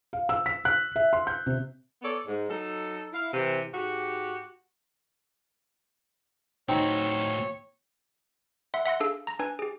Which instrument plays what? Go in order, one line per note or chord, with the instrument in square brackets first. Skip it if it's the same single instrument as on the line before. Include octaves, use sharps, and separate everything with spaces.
[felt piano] F5
E6
B6
F#6
E5
C6
G6
C3
[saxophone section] B3 A4 C#5 D5
G#2
F#3 D#4 A4
E4 F5
C3 E3
G#2 F#4 G4
[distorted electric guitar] A2 F#4 [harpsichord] C4 [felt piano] D#4 [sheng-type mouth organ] C#5
[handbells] E5 F#5 C6
E5 F#5 C6 A#6
D4 G#4 A4 F5
A#5 A#6
D4 B4 G#5 G#6
G4 G#4